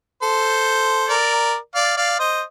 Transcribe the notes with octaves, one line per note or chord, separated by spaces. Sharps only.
A4 C5
A#4 D5
D5 F5
D5 F5
C5 D#5